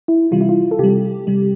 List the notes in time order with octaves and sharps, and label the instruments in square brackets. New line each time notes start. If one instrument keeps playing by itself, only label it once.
[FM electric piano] E4
C3 E3 G3 F4
E4
F4
A4
C3 G3 G4
C3 G3